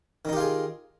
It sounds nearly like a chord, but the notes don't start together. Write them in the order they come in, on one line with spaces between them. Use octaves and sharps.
D#3 D#4 G4 F4 G#4